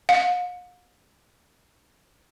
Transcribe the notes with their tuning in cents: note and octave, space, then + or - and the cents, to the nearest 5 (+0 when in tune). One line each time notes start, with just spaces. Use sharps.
F5 +45